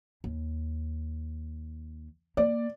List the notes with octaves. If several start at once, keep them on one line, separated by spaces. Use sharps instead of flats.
D#2
A#3 D5